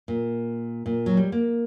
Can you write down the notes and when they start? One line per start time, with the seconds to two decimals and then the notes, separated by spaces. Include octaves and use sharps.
0.08 A#2
0.86 A#2
1.06 F#3
1.17 G3
1.32 A#3